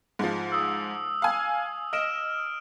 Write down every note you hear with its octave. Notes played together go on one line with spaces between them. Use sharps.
G#2 F3
D#6 E6
F5 G#5
D#5 F6 D7 E7